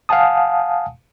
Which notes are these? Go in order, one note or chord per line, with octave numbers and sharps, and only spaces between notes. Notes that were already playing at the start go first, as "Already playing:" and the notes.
F5 F#5 G#5 A5 D#6